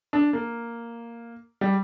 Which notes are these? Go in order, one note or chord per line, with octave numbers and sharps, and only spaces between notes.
D4
A#3
G3